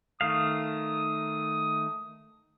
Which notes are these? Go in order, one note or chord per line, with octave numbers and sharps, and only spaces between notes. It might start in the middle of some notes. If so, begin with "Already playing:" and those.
D#3 A3 F5 D#6